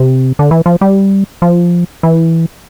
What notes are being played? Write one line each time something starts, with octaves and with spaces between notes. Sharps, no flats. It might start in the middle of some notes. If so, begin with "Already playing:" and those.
Already playing: C3
D3
E3
F3
G3
F3
E3